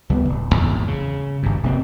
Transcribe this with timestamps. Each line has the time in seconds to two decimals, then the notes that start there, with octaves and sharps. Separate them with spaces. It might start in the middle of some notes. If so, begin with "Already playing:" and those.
0.09 C#2 G3 A#3 B3
0.29 D1
0.55 G#1 E2
0.88 C#3
1.43 G#1 G2
1.63 F1 C3 A#3 C4